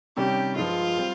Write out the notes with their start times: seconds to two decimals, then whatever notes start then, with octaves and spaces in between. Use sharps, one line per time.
0.17 C3 D#3 G3 C#4 G4
0.56 G2 F3 G#3 F4
0.97 G3 C4